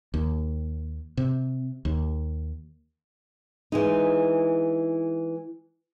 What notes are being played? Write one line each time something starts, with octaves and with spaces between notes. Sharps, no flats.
D#2
C3
D#2
E3 G#3 D#4